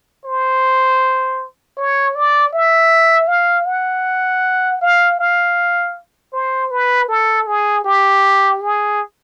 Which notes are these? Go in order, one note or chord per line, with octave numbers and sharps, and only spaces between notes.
C5
C#5
D5
E5
F5
F#5
F5
F5
C5
B4
A4
G#4
G4
G#4